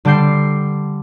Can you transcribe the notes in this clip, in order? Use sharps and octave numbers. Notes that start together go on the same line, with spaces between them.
D3 G3 A5 D6 G6 C7